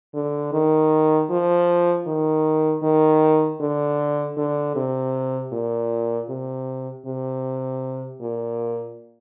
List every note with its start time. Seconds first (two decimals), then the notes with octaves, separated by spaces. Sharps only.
0.14 D3
0.53 D#3
1.30 F3
2.07 D#3
2.83 D#3
3.61 D3
4.37 D3
4.76 C3
5.52 A#2
6.29 C3
7.06 C3
8.21 A#2